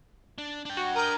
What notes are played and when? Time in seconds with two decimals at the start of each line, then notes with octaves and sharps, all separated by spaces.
0.38 D4
0.65 D4 G5
0.77 F#4
0.96 A#4 A#5 D#6 G6